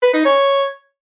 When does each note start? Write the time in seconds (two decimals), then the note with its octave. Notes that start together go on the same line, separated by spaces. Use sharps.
0.02 B4
0.14 D#4
0.25 C#5